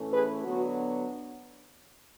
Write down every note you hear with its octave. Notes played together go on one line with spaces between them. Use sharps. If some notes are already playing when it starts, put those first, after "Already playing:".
Already playing: A2 E3 A3 C#4
G#4 B4
D3 F#3 B3 D4 F#4